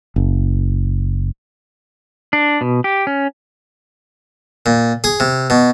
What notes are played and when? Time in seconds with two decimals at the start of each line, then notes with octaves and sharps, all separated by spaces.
0.16 F#1
2.33 D4
2.61 B2
2.84 G4
3.07 C#4
4.66 A#2
5.04 G#4
5.20 C3
5.50 B2